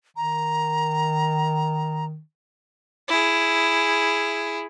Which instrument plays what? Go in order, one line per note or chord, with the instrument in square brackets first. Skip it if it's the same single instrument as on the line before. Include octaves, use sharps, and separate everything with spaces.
[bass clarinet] D#3 [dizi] A#5
[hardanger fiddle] E4 G#4